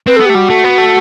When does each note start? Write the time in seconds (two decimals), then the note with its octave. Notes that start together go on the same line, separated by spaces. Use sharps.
0.07 C4 B4
0.16 A4
0.20 B3
0.26 G4
0.30 A3
0.34 G3 F#4
0.49 A3
0.64 B3
0.78 A3